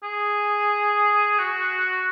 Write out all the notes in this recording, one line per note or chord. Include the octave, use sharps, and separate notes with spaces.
G#4
F#4